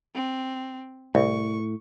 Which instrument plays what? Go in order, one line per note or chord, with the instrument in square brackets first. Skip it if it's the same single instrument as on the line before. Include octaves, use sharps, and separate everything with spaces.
[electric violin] C4
[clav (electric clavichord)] C2 [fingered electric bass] A2 [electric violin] C#6